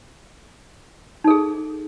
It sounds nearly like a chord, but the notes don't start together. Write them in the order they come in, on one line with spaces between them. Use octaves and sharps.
D#4 A4 G#4